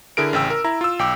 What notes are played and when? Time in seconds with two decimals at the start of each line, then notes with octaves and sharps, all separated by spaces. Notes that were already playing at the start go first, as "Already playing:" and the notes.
0.17 D3 E4 G#4 A#4 D7
0.33 A1 C#3 G5 E6
0.50 A#4
0.64 E4 A#5
0.81 F4 E6
0.99 B1 G5 D6